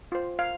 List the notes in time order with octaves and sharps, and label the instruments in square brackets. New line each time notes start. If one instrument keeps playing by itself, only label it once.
[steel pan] F4 C5
F5